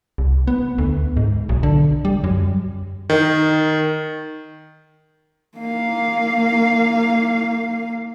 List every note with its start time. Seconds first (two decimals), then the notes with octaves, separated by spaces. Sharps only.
0.18 C2
0.47 B3
0.78 D2
1.17 G#2
1.49 B1
1.63 D3
2.05 G3
2.24 F#2
3.10 D#3
5.58 A#3 F5